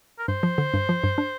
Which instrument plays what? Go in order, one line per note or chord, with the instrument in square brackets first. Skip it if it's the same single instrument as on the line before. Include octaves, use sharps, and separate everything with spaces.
[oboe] A#4
[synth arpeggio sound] G2 [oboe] C5
[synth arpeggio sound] F3
D3
G2
F3
G2
D4